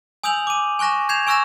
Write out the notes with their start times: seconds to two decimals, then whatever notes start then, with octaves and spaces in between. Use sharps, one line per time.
0.23 G#5 D#6 E6 G6 F7 F#7
0.47 D6 D#7
0.79 G#5 C#6 F#6 A#6 E7
1.09 G6 G#6 C7 E7 F7
1.27 G#5 C#6 E6 F#6 A#6 E7